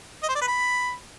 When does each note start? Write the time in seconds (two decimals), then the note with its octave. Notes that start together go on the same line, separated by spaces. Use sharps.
0.23 D#5
0.29 C5
0.35 D5
0.41 B4
0.47 B5